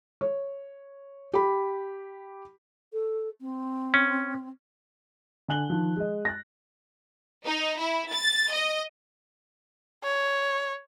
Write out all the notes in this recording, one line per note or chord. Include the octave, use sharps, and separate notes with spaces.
C#5
G4 B5
A4
C4
C#4
D3 G#5 F#6 F#7 G7
D#3 F3
G#3 D#5
F#6 A6 A#6
D#4
E4
A6
D#5
C#5